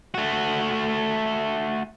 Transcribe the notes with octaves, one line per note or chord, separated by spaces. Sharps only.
A3 F#4